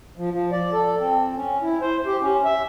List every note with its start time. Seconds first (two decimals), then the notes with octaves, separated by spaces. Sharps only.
0.17 F3
0.31 F3
0.52 D5
0.73 A4
1.00 C4
1.36 C#4
1.62 E4
1.81 C5
2.06 G4
2.21 C#4
2.45 E5